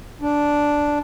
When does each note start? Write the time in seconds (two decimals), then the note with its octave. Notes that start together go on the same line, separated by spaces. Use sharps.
0.22 D4